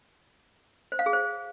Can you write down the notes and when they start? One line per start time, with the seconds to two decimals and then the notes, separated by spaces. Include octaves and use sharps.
0.92 C5
0.99 F5
1.06 G#4
1.13 C5